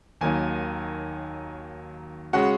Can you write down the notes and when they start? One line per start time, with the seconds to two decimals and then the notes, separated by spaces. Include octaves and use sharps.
0.21 D#2 D#3 F#3 A#3 D#4 G#5
2.33 C#3 G#3 C#4 F#4 F#5